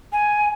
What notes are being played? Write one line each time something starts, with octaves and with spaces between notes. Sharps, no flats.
G#5